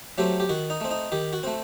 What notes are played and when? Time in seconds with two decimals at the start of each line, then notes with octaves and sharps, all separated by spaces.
0.18 F#3 A3 C4 G4
0.40 G4
0.49 D#3 F#4
0.70 D#4
0.81 A3 C4
0.91 D#4
1.12 D#3 G4
1.33 F#4
1.43 A3 C4